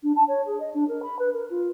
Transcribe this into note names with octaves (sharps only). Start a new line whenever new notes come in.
D4
A5
C#5
G#4
D#5
D4
A#4
B5
B4
A#4
F4